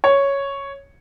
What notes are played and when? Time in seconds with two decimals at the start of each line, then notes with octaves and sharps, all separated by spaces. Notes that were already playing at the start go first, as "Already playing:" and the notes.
0.04 C#5